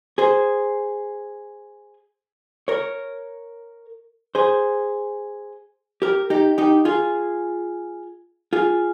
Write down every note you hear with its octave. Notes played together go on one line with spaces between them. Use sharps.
G#4 C5
A#4 C#5
G#4 C5
G4 A#4
D#4 G4
D#4 G4
F4 G#4
F4 G#4